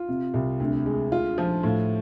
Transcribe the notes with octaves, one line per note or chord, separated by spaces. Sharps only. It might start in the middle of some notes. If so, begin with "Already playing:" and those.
Already playing: F4
C3
C2
D2
G#3
F4
F3
A2